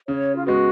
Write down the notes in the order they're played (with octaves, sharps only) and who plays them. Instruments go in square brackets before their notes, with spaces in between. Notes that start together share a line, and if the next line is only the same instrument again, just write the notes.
[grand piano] C#3 [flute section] C#5
[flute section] F4
[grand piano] G#3 B3 [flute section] F#4